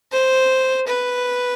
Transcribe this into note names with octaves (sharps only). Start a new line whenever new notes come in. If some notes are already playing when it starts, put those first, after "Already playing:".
C5
B4